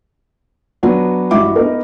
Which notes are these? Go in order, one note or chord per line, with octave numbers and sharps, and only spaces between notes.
F#3 B3 D4 F#4
A1 G2 E4 F#4 E5 D6
B3 D#4 A#4